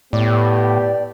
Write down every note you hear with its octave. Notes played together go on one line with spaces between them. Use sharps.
A2 B3 G4 D5